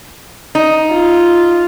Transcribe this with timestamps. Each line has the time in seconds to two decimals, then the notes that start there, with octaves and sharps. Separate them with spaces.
0.55 D#4
0.92 F4